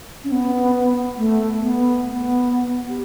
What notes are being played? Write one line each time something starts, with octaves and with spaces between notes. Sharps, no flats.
C#4
B3
A3
B3
B3
G4